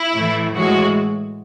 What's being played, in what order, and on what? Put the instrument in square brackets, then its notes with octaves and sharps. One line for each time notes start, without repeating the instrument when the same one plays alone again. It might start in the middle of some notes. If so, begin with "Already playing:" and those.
Already playing: [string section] E4
A2 E3 A3
A2 E3 G#3 F#4